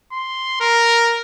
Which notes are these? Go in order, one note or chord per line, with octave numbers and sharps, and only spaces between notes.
C6
A#4